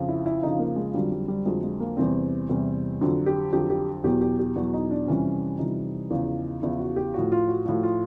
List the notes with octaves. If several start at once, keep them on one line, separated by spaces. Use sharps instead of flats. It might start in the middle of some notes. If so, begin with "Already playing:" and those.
Already playing: F2 C#3 F3
E4
E4
F2 C#3 F3 D#4
A#3
G#3
F2 D3 F#3 G3
G3
G3
F2 D3 F#3 G#3
G#3
A#3
E2 C3 E3 G3 C4
E2 C3 E3 G3
F2 D3 F#3
G4
F2 D3 F#3 G4
G4
E2 B2 F#3 G4
G4
G4
E2 B2 F#3 F#4
D#4
D4
F2 C3 E3 G3 C#4
F2 C3 E3 G3 D#4
E2 C#3 F3
E2 C#3 F3 E4
F#4
G4
A2 F3 F#4
F4
F#4
A2 F3 F#4
F4